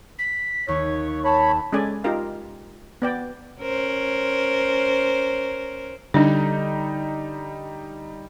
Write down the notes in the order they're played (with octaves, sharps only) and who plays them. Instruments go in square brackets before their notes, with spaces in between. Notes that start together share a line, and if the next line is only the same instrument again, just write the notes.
[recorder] B6
[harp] D#2 [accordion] C#5 [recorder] C#6
[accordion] C#5 B5 [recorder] A5
[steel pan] G#3 C#4 A4 D5 G#5
D#4 F4 G4 A#4 F5
B3 D5 G5
[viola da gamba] C#4 A#4 C5
[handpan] D3 [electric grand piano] G3 D#4 [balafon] D4